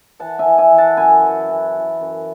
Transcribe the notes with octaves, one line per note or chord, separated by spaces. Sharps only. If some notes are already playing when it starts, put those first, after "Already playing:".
E3 F#5 A5
E5 G#5
E3
E5 G#5
E3
F#5 A5
F#2 G#5 B5
E3
E3
E3
F#2